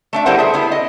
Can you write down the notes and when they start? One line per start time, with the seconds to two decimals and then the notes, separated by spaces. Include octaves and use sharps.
0.13 A3 D4 E5
0.26 G3 E4 A4 A#4 C5 F#5
0.38 G#4 E5
0.54 B3 E4
0.72 D#5